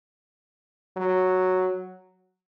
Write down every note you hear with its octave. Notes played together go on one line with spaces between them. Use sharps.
F#3